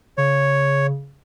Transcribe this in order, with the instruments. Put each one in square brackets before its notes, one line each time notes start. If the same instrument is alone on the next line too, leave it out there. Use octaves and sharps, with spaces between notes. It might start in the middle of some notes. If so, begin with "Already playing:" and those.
[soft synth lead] C#3 [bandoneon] C#5